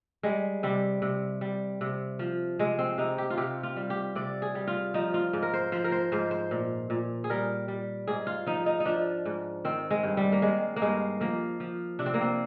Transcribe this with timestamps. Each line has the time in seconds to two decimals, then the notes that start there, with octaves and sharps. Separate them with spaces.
0.23 G3 G#3
0.63 C3 G3
1.02 C3
1.41 G3
1.81 C3
2.19 F3
2.59 C3 G#3
2.79 C4
2.98 C3 D#4
3.18 G4
3.30 F4
3.38 C3 G4
3.63 F4
3.76 G3
3.90 G4
4.15 C3 D5
4.42 G#4
4.55 G3
4.67 F4
4.94 F3 D#4
5.14 F4
5.33 G#2
5.43 A#4
5.54 C5
5.72 F3 C5
5.84 A#4
5.92 C5
6.12 G#2 C5
6.31 C5
6.51 A#2
6.90 A#2
7.24 G#4
7.30 G3 A#4
7.68 G3
8.07 G#2 G#4
8.27 F4
8.46 F3 D#4
8.66 D#4
8.80 D#4
8.85 F3 D4
9.25 G#2
9.65 D#3 C4
9.91 G#3
10.03 G2
10.17 G3
10.32 A#3
10.42 D#3 G#3
10.76 A#3
10.82 G2 G#3
11.21 F3 A#3
11.60 F3
11.99 C3 D4
12.06 C4
12.14 A#3
12.21 C4